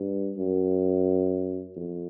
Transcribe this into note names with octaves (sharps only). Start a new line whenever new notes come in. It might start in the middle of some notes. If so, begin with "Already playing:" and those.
Already playing: G2
F#2
F2